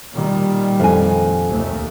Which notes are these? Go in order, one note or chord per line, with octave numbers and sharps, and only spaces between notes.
A#2 D#3 G3
F2 G#5
D#2 A3